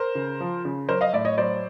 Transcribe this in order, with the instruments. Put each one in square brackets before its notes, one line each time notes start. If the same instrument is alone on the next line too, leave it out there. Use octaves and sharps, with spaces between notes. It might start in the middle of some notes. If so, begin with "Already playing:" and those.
Already playing: [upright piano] A#4 C5
C#3
F3
C#3
F#3 A#4 C5
D#5 F5
A2 D5 E5
C#5 D#5
F#3 C5 D5